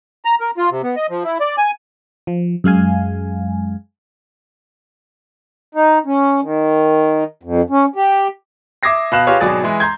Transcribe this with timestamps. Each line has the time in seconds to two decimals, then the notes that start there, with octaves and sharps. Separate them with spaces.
0.25 A#5
0.40 A#4
0.57 F4
0.71 C3
0.83 B3
0.96 D#5
1.10 F3
1.24 E4
1.40 D5
1.58 G#5
2.27 F3
2.64 F#2 G#3 F5 G#5
5.75 D#4
6.06 C#4
6.42 D#3
7.43 F2
7.70 C#4
7.96 G4
8.83 E5 D6 D#6 G#6 A#6 C7
9.12 B2 F5 F#6 E7 F#7
9.27 F4 G4 G#4 B4 C#5 F5
9.40 G#1 B2 F#3 G#4 D5 A6
9.64 E3 G#3
9.80 A#5 C6 G6 G#6